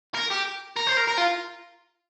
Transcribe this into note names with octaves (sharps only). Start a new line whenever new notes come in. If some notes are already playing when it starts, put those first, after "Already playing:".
A#4
G4
A#4
C5
A#4
A#4
F4